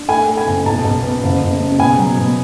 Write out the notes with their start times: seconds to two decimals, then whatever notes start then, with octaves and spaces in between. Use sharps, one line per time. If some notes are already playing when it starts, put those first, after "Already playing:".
Already playing: D4
0.08 A3 G#5
0.27 A3
0.37 G#5
0.46 F#1
0.66 B1 A5
0.84 B1
1.03 B3
1.23 F#1
1.41 F#1
1.60 C#3
1.79 B2 G#5
1.98 F#3
2.17 B2